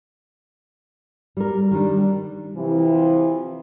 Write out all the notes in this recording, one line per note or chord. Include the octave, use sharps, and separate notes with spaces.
G3 A#4
D#3 G3 D4
C3 E3 F3